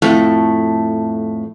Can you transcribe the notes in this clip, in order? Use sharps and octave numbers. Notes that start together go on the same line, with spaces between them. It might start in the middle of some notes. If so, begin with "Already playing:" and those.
F2 A2 A3